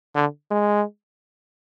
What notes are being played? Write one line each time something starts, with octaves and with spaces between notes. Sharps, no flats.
D3
G#3